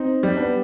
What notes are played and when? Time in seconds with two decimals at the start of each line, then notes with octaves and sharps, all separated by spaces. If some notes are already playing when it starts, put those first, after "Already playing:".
Already playing: C4 D#4
0.23 G3
0.37 B3 D4